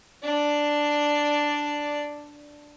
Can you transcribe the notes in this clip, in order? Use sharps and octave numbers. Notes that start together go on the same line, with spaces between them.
D4 D5